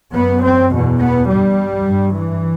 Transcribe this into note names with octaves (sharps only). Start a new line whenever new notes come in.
F#2 B3
C4
E2 B2
B3
G2 G3
G2
E3